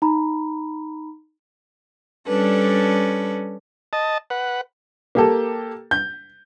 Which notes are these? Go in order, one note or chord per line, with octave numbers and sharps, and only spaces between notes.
D#4 A#5 B5
G3 C#4 D4 A4 B4
D#5 A5
B4 F#5
A#3 G4 A4
G6